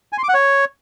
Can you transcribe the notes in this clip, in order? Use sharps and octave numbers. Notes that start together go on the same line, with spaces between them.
G#5
C6
D6
F#5
C#5